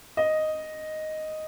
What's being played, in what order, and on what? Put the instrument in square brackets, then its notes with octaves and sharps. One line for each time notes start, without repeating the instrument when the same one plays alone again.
[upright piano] D#5